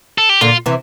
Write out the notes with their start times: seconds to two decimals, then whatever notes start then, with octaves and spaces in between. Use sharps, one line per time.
0.18 A4
0.29 G4
0.41 A#2 D3 F4
0.66 C3 E3